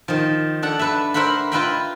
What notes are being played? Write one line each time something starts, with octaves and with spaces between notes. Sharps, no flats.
D#3 F3
D4 A4 F#5
A4 B4 E5
A#4 C5 E5 F#5 B5
F4 B4 D#5 E5 G5 B5